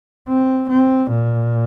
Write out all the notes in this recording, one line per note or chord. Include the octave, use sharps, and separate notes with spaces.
C4
C4
A#2